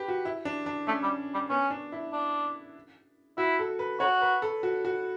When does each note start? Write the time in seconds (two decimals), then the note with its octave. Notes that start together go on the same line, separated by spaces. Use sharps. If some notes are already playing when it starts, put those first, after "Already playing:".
Already playing: G4 B4
0.08 F#4
0.25 E4
0.45 D4
0.66 D4
0.87 A3 C#4
1.03 G3
1.34 G3
1.50 B3 C#4
1.71 D4
1.92 E4
2.13 D4
3.38 E4 F#4
3.59 A4
3.79 B4
4.00 F#4 C#5
4.22 B4
4.42 A4
4.63 F#4
4.85 F#4